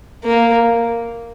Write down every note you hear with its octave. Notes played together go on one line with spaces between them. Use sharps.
A#3